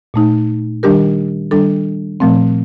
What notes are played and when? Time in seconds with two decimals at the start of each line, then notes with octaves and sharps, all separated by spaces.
0.14 A#2 A3 D#4
0.83 D#3 G3 D4 G4 A#4
1.51 D#3 G3 D4 A4
2.20 A#2 F3 A3 C4